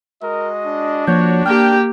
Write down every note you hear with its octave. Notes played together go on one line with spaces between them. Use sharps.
G#3 F#4 A#4 D#5
D4
F3 A#3 F#4 C#5 G6
A#3 G4 G5 F6